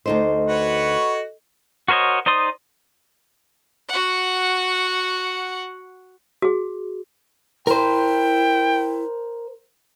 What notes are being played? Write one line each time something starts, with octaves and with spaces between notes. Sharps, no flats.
D2 D#4 A4 C5 D#5
F#4 B4 C#5
F#4 A#4 C5 C#5 D#5
D#4 C5 D5 C6 D#6
F#4 F#5
F#4 G#4
E4 A#4 C5 G5